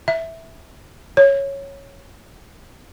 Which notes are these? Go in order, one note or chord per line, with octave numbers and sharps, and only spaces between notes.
E5
C#5